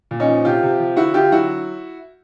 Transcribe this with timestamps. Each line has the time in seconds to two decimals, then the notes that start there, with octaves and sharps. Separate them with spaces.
0.11 A#2
0.20 C#4 D#4
0.28 F3
0.45 C3 F4 G4
0.63 C3
0.80 F3
0.97 D3 E4 F#4
1.14 D3 F4 G4
1.32 F#3 E4 F#4